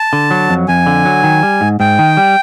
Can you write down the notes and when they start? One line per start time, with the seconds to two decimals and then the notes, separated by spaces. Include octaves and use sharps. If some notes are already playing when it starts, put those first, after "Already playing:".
Already playing: A5
0.13 D3
0.31 F#3
0.49 F2
0.68 F2 G#5
0.86 D3
1.05 F#3
1.24 D#3
1.43 G3
1.61 G#2
1.80 G#2 G5
1.99 D#3
2.17 G3